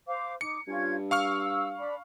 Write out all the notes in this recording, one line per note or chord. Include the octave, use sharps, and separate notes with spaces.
C5 F5 D6
D#4 D6 C#7
G2 C#4 F4 G#6
F5 C#6 E6 F6
D4 B5